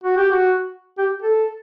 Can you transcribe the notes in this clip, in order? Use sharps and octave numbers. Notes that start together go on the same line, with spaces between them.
F#4
G4
F#4
G4
A4